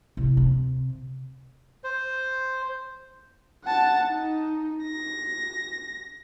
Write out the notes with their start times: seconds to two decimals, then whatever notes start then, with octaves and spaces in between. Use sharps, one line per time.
0.17 C2
0.37 C3
1.84 C5
3.64 F#5 A5
4.10 D#4
4.84 A#6